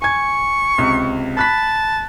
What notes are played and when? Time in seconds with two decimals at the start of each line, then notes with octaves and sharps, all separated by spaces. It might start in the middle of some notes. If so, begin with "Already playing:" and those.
0.02 G#5 C#6 G#6
0.78 C#2 C3
1.37 A5 B5 F#6 B6